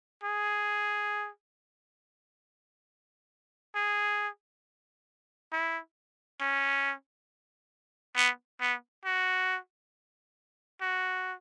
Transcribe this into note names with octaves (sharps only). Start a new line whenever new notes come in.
G#4
G#4
E4
C#4
B3
B3
F#4
F#4